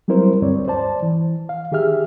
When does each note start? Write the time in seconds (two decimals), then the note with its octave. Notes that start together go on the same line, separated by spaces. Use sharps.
0.08 F#3 G3 C4 E4 A#4 C5
0.42 D2 G2 C4 C#5 D5
0.68 C5 D5 A5
1.02 E3
1.49 F5
1.72 D#3 G4 G#4 E5 F6